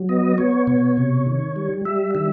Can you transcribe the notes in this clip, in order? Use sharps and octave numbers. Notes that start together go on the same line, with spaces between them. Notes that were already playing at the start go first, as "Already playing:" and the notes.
Already playing: F#3
B3 D#5
B3 C#5
B2 C#5
C3
D#3
G3
G3 E5
D#3 E5